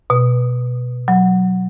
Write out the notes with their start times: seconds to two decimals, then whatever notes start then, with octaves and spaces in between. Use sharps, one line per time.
0.10 B2
1.08 F#3